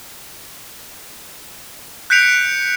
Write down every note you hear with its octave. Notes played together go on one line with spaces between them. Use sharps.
F#6 G6 B6 C#7 D7 F7